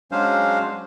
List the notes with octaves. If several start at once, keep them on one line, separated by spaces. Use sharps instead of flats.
F#3 G#3 C#4 D4 C5 F5